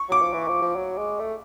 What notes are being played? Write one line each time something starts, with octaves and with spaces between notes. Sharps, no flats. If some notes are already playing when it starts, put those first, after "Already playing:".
Already playing: C#6
F#3 D6
F3
E3
F3
F3
F#3
G#3
A3